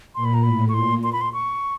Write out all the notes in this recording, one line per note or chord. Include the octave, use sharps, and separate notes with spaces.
A#2 C6
B5
A#5
A2 B5
C#6
A#2 C6
C6
B5
C6
C#6